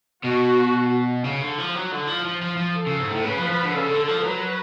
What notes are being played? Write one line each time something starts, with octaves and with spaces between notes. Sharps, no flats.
B2 F#4
C#3
D3
F3
F#3
D3
F3
F3
F3
F3
A4
C#3
G#2
A2
C#3 B4
F3
F3
D3
C#3 A4
D3
F3
F#3 B4